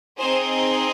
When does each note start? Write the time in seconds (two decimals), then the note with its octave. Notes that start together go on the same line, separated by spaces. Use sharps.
0.19 C4 D#4 G#4 C5